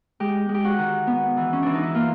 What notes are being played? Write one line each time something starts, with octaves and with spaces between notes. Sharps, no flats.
G#3 G4
G#3
G4
F#4
D#3
B3
E3
C#4
E3 D4
D#4
E4
A#3 F4